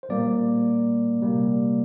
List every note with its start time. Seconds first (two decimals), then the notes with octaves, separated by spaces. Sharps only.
0.03 C5
0.09 A#2 G3 A#3 D5
1.21 C3 G3 A#3